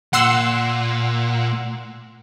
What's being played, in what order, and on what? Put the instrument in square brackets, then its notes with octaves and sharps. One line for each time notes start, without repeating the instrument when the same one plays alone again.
[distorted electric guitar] A#2 [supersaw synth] F#5 C6 E6